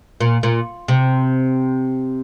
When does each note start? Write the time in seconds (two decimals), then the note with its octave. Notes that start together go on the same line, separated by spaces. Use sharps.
0.21 A#2
0.43 A#2
0.88 C3